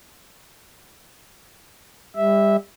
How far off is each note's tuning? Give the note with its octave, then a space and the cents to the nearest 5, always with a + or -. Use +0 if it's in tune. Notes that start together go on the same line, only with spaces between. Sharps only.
G3 +30 E5 -10